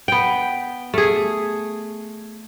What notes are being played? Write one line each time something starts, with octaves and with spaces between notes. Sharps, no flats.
B3 G5
A3 G#4